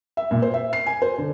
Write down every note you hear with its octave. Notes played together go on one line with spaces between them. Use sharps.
E5
A#2
C5
E5
C7
G#5
C5
D3